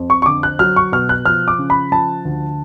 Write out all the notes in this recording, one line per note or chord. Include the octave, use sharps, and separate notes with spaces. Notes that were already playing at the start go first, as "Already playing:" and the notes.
Already playing: F2
C#6
C#6
D3 D6
F#6
F#3 F6
C#6
B2 F6
F#6
F3 F6
D6
C#3
B5
F3 A5
D2